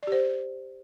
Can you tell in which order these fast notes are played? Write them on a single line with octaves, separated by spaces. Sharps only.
D5 G4 C5